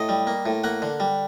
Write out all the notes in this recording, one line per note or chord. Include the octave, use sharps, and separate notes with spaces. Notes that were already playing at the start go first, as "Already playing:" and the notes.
Already playing: A2 D#5
G3
A#3
A2
A#3 F#5
D3
G3